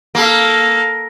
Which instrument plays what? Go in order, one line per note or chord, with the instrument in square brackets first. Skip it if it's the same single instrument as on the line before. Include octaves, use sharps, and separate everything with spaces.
[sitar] A#3 [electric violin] A4 F5